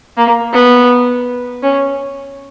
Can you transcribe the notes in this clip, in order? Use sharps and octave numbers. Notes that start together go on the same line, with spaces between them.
A#3
B3
C#4